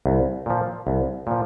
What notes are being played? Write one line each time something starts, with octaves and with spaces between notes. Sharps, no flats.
C2
A#2 F3
C2
A#2 F3